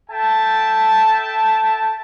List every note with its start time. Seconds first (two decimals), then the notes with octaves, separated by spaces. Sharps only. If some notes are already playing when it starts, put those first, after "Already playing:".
0.10 A4 E5 G5 A5